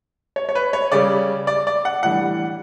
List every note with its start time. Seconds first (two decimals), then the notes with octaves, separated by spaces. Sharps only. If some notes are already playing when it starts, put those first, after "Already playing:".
0.36 C#5
0.49 C#5
0.55 B4
0.73 C#5
0.92 C#3 G3 C#4 D5
1.47 D5
1.67 D5
1.85 F#5
2.03 A2 E3 G3 D4 F#5